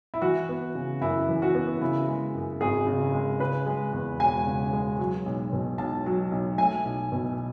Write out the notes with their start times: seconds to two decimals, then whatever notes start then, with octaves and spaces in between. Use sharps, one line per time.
0.14 E4
0.22 E3 F#4
0.49 B3
0.75 C#3
1.01 F#2 E4
1.28 E3
1.42 F#4
1.55 B3
1.81 C#3 E4
2.08 G#3
2.35 F#2
2.61 G#1 G#4
2.87 C#3
3.13 G#3
3.40 C#3 B4
3.66 G#3
3.93 E2
4.20 E1 G#5
4.47 C#3
4.73 G#3
4.99 F#3
5.26 B1
5.53 B2
5.78 B1 A5
6.06 F#3
6.32 B1
6.58 A3 G#5
6.85 B1
7.12 B2